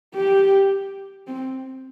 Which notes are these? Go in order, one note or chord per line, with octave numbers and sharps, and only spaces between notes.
G4
C4